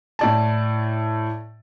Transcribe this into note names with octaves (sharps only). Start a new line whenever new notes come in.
A2 D5 A5